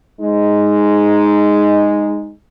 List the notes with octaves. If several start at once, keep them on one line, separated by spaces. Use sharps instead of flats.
G#3 D#4